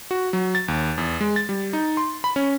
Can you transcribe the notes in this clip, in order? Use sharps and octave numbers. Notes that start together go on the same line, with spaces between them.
F#4
F#3
A6
D#2
E2
G#3
A6
G3
D#4
C6
B5
C#4